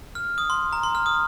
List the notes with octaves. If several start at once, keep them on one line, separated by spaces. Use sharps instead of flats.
F6
D#6
C6
A#5
C6
F6
D#6